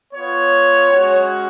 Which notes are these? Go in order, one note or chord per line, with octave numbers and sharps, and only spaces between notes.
B3 F4 C#5
G#3 C#4 F#4